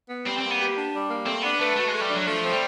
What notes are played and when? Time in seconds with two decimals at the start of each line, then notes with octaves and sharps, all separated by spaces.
0.09 B3
0.26 G3 C4
0.38 A#3 C4
0.50 B3
0.59 G4
0.76 D4
0.92 G3
1.09 A#3
1.26 A3 C4
1.42 B3 D4
1.59 A3 B4
1.76 A3 F#4
1.88 G#3 A3
2.01 G3
2.10 F#3 D4
2.26 F3 A3
2.43 C4
2.52 G3